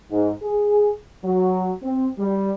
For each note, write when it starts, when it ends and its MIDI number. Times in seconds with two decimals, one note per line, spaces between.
0.11 0.30 44
0.42 0.92 68
1.23 1.70 54
1.82 2.07 60
2.19 2.52 55